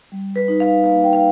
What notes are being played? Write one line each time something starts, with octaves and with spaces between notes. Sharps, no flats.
G3
B4
D#4
F5
A#3 F5
G5
F5